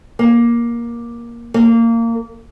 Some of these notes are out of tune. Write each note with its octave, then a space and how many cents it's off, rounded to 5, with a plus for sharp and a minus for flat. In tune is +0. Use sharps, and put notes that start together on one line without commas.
A#3 +15
A#3 -20